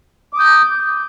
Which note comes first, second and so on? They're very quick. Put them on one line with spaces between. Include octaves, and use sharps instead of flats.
D6 D#6 G6